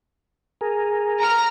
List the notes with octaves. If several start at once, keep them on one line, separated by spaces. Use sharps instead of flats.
G#4 A#4
A#5 F6